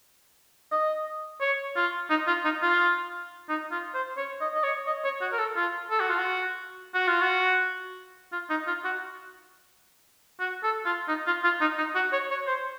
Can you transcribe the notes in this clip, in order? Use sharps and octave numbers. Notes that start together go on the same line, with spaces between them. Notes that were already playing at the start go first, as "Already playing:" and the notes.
D#5
C#5
F4
D#4
F4
D#4
F4
D#4
F4
C5
C#5
D#5
D#5
C#5
D#5
C#5
F#4
A#4
A4
F4
A4
F#4
F4
F#4
F#4
F4
F#4
F4
D#4
F4
F#4
F#4
A4
F4
D#4
F4
F4
D#4
D#4
F#4
C#5
C#5
C5